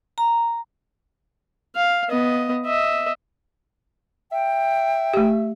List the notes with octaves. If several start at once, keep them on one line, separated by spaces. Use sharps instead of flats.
A#5
F5
B3 D#5
D#5 E5
E5 G5
A3 G4